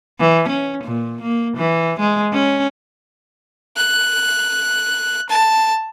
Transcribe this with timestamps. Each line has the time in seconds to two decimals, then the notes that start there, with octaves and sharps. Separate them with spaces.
0.20 E3
0.49 C#4
0.84 A#2
1.22 A#3
1.57 E3
2.00 G#3
2.33 C#4
3.76 F#6
5.29 A5